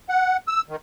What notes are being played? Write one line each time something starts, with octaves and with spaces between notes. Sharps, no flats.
F#5
E6
D#3